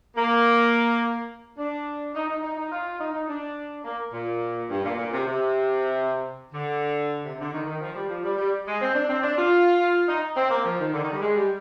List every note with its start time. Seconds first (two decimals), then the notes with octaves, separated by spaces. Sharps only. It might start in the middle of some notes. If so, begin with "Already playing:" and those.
0.16 A#3
1.57 D4
2.14 D#4
2.28 D#4
2.41 D#4
2.56 D#4
2.70 F4
2.98 D#4
3.13 D#4
3.28 D4
3.83 A#3
4.12 A#2
4.69 G2
4.83 A#2
4.97 A#2
5.12 C3
5.25 C3
6.53 D3
7.24 C3
7.38 D3
7.52 D#3
7.66 D#3
7.80 F3
7.94 G3
8.09 F3
8.23 G3
8.37 G3
8.66 G#3
8.80 C4
8.94 D4
9.08 C4
9.22 D4
9.37 F4
10.07 D#4
10.35 C4
10.50 A#3
10.63 F3
10.78 D#3
10.92 D3
11.02 D#3
11.11 G3
11.21 G#3
11.35 G3